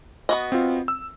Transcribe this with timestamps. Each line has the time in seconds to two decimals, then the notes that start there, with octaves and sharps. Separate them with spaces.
0.29 B3 F#4 D#5
0.52 C4 F4
0.88 E6